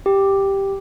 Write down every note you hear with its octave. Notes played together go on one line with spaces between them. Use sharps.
G4